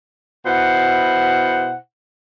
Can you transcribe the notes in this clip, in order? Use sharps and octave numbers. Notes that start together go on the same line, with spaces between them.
B2 E4 C5 F#5